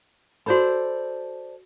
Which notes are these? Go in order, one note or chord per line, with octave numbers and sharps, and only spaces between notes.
F#4 A4 C5 D5 B5